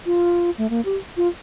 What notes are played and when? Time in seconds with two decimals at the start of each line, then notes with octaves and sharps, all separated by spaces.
0.06 F4
0.58 A3
0.70 A#3
0.85 G4
1.17 F4